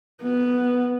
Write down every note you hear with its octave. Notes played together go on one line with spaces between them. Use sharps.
B3